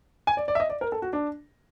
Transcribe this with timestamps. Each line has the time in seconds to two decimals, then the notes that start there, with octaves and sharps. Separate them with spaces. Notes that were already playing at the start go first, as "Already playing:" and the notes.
0.27 G#5
0.37 D5
0.48 D5
0.55 E5
0.60 D#5
0.69 D5
0.81 A#4
0.92 A4
1.02 F#4
1.13 D4